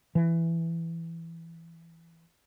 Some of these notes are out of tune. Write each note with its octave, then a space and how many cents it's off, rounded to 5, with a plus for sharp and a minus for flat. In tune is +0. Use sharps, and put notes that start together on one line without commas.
E3 +10